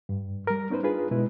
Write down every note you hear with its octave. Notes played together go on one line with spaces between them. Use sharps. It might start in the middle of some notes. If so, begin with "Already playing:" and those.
G2
G3 A#4
B3 C#4 D#4 B4 C5
D4 F4 G#4 B4
B2 G#3 E4 B4